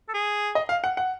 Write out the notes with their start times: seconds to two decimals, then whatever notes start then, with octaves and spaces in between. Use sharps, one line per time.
0.09 A4
0.14 G#4
0.55 D#5
0.69 F5
0.84 F#5
0.97 F#5